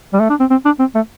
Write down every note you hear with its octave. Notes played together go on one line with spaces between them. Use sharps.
G3
A3
D4
C4
C4
D4
C4
A3